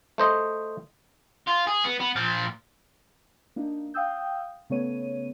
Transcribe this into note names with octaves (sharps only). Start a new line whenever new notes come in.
A3 C5 D#5
F4
G#4
B3
B3
A#2 F3
A#3 D4 D#4
F5 G5 D#6 E6 G6
C#3 A3 B3 C#5 D#7